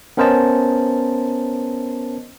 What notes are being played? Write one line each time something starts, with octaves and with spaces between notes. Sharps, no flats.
B3 C#4 A#4 C5 D#5 A5